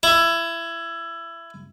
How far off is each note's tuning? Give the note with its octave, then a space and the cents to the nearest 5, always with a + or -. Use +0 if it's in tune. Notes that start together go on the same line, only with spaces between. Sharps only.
E4 +20